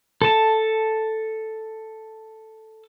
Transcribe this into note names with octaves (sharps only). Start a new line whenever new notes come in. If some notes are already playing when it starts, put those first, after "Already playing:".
A4 A5